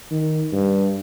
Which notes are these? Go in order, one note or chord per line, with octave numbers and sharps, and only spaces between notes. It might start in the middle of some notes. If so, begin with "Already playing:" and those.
D#3
G2